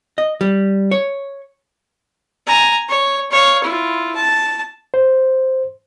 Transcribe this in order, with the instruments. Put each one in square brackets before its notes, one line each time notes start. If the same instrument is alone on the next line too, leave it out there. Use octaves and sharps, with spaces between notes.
[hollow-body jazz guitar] D#5
G3
C#5
[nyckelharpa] G#5 A#5
C#5
C#5 F5
E4 F4
A5
[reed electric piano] C5